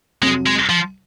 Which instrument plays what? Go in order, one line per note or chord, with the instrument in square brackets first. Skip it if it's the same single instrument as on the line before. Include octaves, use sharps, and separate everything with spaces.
[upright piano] F2 C3 F#3 [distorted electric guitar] G#3
[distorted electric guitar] G#3
F3